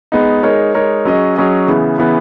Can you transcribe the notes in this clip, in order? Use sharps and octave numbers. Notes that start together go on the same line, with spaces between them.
G#3 B3 D#4
G#3 D#4 A#4 C#5
G#3 D#4 A#4 C#5
F#3 C#4 G#4 D#5
F#3 C#4 G#4 D#5
C#3 E3 B3
C#3 E3 B3